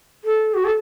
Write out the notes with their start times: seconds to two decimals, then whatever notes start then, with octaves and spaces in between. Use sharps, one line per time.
0.24 A4
0.54 F#4
0.64 A4